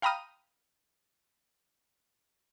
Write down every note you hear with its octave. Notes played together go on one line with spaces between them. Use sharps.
F5 G5 A#5 B5 D#6 F6